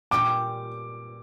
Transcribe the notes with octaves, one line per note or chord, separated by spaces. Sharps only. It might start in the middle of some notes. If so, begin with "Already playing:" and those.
A#2 G3 C#4 G4 D6